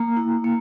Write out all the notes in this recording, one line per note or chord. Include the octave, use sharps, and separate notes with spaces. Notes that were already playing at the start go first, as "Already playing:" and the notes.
Already playing: A#3 A#5
E4
A#3